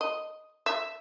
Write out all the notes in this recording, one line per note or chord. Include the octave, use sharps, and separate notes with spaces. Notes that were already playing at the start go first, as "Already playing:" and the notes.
D#5
E5